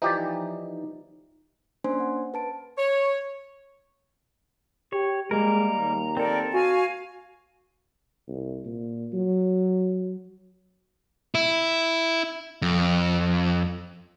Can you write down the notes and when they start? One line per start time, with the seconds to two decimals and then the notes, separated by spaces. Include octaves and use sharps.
0.02 E3 F3 D#4 G4 D5
1.84 A#3 C#4 D4 C5 G#5 C6
2.00 F#5
2.34 B4 A5 D7
2.78 C#5
4.93 G4 C#5
5.31 G3 G#3 A#3 A#4 A#5
5.78 D#2
6.17 C4 A4 A#4 D5
6.53 F#4 F5 G#5
8.28 C2
8.65 A#2
9.13 F#3
11.35 E4
12.62 F2